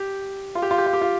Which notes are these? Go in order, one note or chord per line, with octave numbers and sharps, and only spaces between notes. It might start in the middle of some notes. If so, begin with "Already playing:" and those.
Already playing: G4
F4
G4
F4
G4
F4
G4
F4